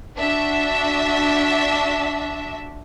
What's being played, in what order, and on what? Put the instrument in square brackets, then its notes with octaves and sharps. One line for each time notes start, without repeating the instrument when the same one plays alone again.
[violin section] D4 F#4 E5